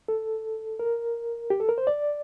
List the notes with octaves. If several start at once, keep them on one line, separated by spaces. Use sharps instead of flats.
A4
A#4
G4
A4
A#4
C5
D5